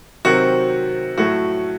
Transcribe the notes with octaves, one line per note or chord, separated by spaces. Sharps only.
C3 D#3 F#3 C4 F#4
A2 F#3 A3 F#4